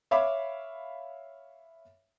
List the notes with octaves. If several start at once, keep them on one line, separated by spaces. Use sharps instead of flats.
C#5 E5 F5 B5 D6